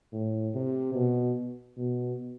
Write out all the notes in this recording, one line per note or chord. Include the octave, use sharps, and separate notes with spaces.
A2
C3
B2
B2